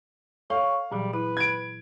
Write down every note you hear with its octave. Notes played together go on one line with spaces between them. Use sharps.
A4 C#5 F5
A#2 E3 F#3 G3
E4 B4
G#6 D7